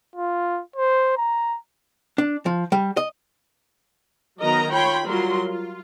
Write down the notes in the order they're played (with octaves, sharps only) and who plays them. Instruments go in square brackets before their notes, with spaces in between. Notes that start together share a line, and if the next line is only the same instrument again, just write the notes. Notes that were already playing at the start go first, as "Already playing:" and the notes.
[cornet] F4
C5
A#5
[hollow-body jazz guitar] D4
F3
G3
D#5
[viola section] D#3 F#3 B3 A#4 D#5 A#5
F4 C#5 G5 B5 C6
F#3 G3 F4 A#4 C6
F4